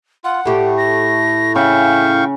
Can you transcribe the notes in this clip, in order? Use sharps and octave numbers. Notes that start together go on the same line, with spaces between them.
F4 F#5
A2 A3 G4
A#6
C#3 E5 F5 G5 C#6